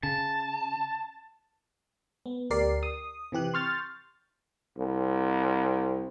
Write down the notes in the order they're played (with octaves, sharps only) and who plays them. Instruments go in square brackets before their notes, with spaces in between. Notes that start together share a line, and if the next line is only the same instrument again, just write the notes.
[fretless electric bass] C#3 [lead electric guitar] A5
[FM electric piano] B3
D2 G4 A#4 D5 C7
D#6
C3 E3 G4 F#6
C6 C#6 F6 G6 A6
[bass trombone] C2